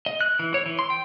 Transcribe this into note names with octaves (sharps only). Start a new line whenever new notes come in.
D#5
F#6
E3
C#5
E3
C6
G5